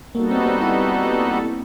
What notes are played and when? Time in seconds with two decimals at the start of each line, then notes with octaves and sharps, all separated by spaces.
0.15 G3 A#3 B3 D#4 F#4 A4
0.31 C4
0.46 C4
0.62 E4